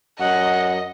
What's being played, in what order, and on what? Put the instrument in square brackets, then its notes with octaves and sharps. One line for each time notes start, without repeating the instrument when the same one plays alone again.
[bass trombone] F#2 [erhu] D#5 [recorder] F#5